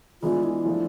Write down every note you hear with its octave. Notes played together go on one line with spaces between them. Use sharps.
E3 G#3 B3 D4 F4 G#4
E4
F3 A3 D4